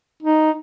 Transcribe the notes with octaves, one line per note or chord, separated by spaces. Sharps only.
D#4